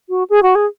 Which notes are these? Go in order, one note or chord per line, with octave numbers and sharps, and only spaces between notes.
F#4
G#4
F#4
G#4